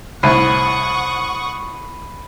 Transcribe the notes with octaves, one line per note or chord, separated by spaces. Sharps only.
C2 A2 F#5 B5 C#6 D#6 C7 D#7